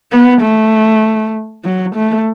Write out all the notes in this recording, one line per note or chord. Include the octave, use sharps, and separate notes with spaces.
B3
A3
F#3
A3